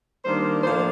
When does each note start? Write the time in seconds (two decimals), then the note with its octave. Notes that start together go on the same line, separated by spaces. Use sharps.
0.24 D#3 G3 A#3 D4 C5
0.63 A2 F3 A#3 D4 C5